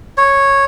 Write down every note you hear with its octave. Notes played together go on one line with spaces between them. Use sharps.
C#5